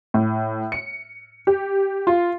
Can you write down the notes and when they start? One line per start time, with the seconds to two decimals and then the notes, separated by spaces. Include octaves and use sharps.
0.14 A2
0.72 C#7
1.47 G4
2.07 F4